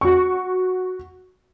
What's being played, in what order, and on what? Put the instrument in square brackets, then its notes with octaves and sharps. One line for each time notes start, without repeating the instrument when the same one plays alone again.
[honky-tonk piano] F#4 C#6